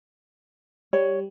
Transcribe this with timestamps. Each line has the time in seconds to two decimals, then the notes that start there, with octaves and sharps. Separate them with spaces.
0.93 G3 C#5